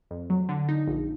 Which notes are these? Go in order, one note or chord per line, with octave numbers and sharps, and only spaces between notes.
F2
F#3
D3
D#4
A#1